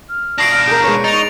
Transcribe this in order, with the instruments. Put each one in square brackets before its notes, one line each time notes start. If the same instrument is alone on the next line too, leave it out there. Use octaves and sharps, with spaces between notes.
[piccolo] F6
[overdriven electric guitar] B2 D4 [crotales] A#6 C7 D7
[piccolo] F6
[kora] G#4 A#4 [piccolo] G6
[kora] G#3 B4 C#5 [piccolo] C#6
[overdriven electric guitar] D#4 [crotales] A6 F7